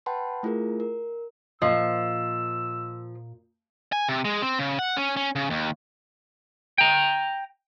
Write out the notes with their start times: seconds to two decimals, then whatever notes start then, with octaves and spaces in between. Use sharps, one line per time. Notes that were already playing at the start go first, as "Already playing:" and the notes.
0.06 B4 F#5 G5 A5 B5 C6
0.43 A3 E4 F4 G#4 A#4
0.80 A#4
1.62 A#2 F3 F4 C5 D#5 E6
3.92 G#5
4.09 C3
4.25 G#3
4.42 C4
4.59 C#3
4.79 F#5
4.97 C#4
5.17 C#4
5.36 C#3
5.50 D#2
6.78 G5 A#5